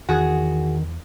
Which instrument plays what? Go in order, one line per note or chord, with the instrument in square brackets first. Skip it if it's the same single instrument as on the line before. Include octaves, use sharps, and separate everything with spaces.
[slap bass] E2 [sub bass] D#3 [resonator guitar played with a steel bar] F#4 G#4